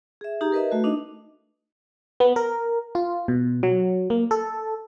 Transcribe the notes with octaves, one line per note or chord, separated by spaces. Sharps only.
G#4 E5
D#4 G4 G#4 A#5
A#4 B4 D#5 E5
A3 F#4 A4 B4
D4 D#4 D#5
B3
A#4
F4
B2
F#3
A#3
A4